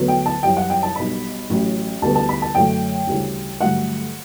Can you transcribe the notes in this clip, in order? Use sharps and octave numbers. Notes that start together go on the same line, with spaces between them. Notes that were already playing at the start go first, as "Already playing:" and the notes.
Already playing: D2 D3 F#3 B3
G5
A5
F#2 E3 G3 G5
F#5
G5
A5
B1 B2 G3 D4 B5
A1 A2 F#3 C#4
D2 D3 G3 B3 D4 A5
A5
B5
A5
F#2 D3 F#3 A3 D4 G5
D2 C#3 E3 G3 D4
G2 D3 F#3 A3 F#5